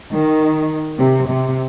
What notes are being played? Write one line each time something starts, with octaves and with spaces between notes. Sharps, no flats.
D#3
C3
C3